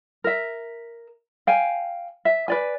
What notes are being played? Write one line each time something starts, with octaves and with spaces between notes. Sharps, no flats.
A#4 E5
F5 G5 G#5
E5
B4 D5 G#5